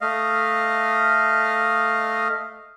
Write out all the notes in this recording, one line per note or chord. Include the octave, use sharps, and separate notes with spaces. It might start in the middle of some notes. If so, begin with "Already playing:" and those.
A3 D#5 F5